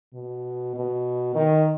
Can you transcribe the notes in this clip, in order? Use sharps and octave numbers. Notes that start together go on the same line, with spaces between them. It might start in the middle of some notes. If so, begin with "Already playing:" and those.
B2
B2
D#3